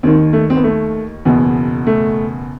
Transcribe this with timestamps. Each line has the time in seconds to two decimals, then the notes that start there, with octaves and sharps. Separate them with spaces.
0.03 D#2 D#3 C4
0.33 A3
0.50 C4
0.56 B3
0.64 A3
1.25 F#1 E2 B2
1.87 A3